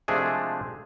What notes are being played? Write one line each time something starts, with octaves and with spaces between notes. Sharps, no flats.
C3 F3 G#3 A3 D4 G#4